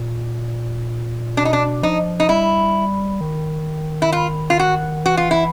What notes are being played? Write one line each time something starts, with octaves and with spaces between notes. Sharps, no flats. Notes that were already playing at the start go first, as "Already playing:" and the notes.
Already playing: A#2
B2 D4
D#4
D4
F3 D#4
D#4
G3 E4
D#3
E4
F4
F4
F#4
E3 F#4
F4
E4